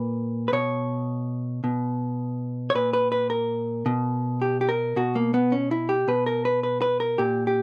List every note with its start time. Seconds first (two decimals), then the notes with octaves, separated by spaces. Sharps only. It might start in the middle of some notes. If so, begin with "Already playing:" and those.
Already playing: A#2 B4
0.48 B4
0.53 B2 C#5
1.64 B2
2.70 C#5
2.75 A#2 B4
2.93 B4
3.12 B4
3.30 A#4
3.86 B2
4.42 G4
4.61 G4
4.69 A#4
4.96 B2 F#4
5.15 A#3
5.34 B3
5.52 C#4
5.71 E4
5.89 G4
6.08 B2 B4
6.26 A#4
6.45 B4
6.63 B4
6.82 B4
7.00 A#4
7.18 A#2 G4
7.47 G4